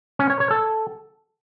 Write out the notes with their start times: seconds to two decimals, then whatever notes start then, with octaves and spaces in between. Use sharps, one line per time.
0.19 C#4
0.30 C#5
0.40 C#5
0.51 A4